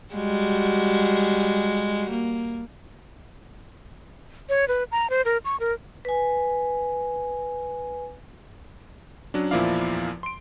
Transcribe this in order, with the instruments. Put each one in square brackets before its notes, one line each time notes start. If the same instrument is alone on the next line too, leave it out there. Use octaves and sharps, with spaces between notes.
[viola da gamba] G3 G#3 F#4
A#3
[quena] C#5
B4
A#5
C5
A#4
C#6
A#4
[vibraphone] B4 G#5
[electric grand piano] F#3 C#4 D4
E2 A#2 F3 E4 D5 F5
C6 D7